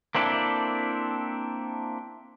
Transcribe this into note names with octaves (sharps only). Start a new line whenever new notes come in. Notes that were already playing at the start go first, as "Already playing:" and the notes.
A#3 C4 D4 E4 F#4 A4